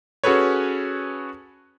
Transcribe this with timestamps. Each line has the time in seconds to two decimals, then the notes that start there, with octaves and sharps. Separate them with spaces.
0.24 C#4 F#4 G#4 A4 B4 C#5